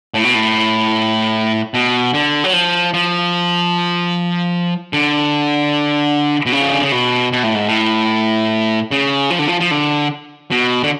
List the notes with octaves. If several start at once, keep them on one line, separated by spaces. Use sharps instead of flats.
A2
B2
A2
B2
D3
F#3
F3
F3
D3
B2
C#3
F3
D3
C#3
B2
B2
A2
G#2
A2
C#3
F3
D3
F3
F3
D3
B2
D3